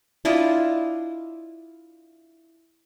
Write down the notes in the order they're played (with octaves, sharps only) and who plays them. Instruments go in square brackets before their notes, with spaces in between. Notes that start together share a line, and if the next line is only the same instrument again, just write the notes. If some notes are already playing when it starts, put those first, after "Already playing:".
[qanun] D4 E4 F4 D#5